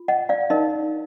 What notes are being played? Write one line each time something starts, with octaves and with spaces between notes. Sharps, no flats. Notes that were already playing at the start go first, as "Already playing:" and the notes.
Already playing: F4
D#5 F#5
D5 F5
D#4 A#4 D#5